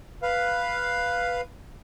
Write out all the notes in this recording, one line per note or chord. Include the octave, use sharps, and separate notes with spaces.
B4 F5